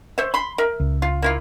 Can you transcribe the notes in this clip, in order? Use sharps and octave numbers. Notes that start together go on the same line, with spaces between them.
C5 C#5 E5
B5 C6
A#4 E5
C#2
F4
A#3 E4 F4